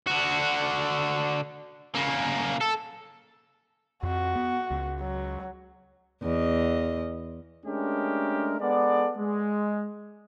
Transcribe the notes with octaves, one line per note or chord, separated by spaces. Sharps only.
D3 F#4
C#3 A#3
A4
F2 F#4
B3
C#2
F#3
E2 D#5
G#3 A3 C#4 D4 G4 A#4
G#3 B3 A4 D5
G#3